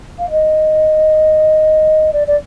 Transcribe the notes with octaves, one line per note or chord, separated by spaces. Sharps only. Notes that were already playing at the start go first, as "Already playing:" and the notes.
F5
D#5
D5
D5